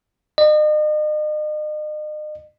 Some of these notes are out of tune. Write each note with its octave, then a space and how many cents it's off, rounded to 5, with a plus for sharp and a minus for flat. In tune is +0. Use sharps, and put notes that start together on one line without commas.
D#5 -40